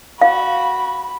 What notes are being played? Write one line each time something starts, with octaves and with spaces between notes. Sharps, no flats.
F#4 F5 B5